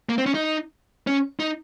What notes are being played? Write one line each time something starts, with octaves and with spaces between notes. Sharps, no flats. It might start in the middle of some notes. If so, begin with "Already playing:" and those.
A#3
C4
C#4
D#4
C#4
D#4